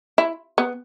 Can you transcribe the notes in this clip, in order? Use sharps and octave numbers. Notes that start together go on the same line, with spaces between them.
E4
B3